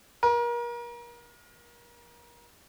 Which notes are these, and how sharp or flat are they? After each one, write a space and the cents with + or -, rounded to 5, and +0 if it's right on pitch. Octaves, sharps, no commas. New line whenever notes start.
A#4 +35